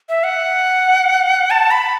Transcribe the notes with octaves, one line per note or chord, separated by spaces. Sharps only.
E5
F#5
A5
B5